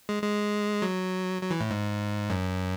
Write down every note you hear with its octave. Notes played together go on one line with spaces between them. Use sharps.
G#3
G#3
F#3
F#3
E3
A2
G#2
F#2